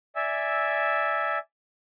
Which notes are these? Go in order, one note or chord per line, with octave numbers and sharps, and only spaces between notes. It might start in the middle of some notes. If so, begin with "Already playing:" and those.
D5 E5 G#5 E6